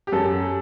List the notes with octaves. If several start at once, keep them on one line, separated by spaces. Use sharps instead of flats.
G4
F#2 A4